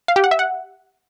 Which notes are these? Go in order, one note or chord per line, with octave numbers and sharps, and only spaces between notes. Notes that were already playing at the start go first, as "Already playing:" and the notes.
F5
G4
F#5
E5
F#5